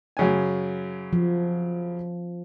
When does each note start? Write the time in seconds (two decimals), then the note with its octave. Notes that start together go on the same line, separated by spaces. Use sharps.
0.17 F#2 C#3 G#5
1.13 F3